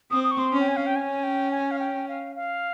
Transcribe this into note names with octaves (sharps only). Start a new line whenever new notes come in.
C4 D#6
D#6
C#6
C6
C#4
G5
G#5
F5
G5
C#4 G#5
G5
G#5
F5
G5
F5
F5